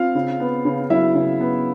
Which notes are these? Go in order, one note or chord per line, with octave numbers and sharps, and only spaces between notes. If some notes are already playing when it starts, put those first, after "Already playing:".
Already playing: C4 F4 F5
C#3
B3
C#3
F#3 E4 E5
C#3
B3